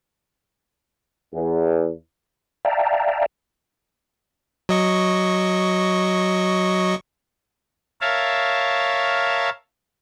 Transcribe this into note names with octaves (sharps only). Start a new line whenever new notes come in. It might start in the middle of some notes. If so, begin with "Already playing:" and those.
E2
D5 E5 F5 G5 A5 A#5
F#3 D#5 C#6
A#4 C#5 E5 F5 A5